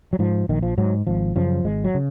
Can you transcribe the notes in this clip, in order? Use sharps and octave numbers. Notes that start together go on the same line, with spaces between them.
F#3
G#2 F3
A#1 D#3
F3
G#2 F#3
G#1 F3
F#2 C#3 F3
G#1 G#3
F#3
C#3